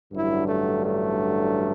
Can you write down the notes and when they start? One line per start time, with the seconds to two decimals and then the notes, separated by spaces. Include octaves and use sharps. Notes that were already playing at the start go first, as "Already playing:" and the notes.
0.13 A1 G2 D3 F#3 E4
0.48 A3
0.83 A3